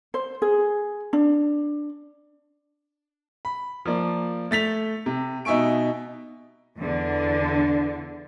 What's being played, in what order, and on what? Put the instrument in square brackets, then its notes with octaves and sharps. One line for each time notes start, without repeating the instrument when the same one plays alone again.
[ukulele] C5
G#4
D4
[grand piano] B5
F3 A#3 D5
A3 A6 B6 F7
C3
B2 D#4 E5 G#5 C#6 D7
[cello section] E2 D3